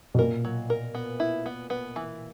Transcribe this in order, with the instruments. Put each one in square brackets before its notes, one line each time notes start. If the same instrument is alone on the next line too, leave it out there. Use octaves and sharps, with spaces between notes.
[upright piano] B2
[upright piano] A#2 [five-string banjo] A#4
[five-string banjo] F#3
A#4
B3
E4
B3
B3
E3